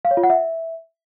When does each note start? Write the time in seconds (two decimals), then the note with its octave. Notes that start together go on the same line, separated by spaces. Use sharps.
0.05 F5
0.11 C#5
0.17 F4
0.23 F#5
0.30 E5